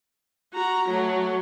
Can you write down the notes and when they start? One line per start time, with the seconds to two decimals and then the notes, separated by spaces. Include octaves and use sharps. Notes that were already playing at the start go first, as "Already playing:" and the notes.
0.53 F#4 A#5
0.89 F#3 A3